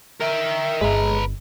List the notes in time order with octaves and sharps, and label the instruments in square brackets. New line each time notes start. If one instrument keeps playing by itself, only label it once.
[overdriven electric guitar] A#4 G5 [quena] E5
[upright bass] G1 [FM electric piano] G#3 [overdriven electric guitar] B4 A#5